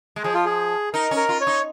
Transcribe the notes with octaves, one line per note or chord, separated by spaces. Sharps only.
G#3
F3 G#4
F4
G#4
D#4 A#4
C#4
A#4
F4
C#5
D#4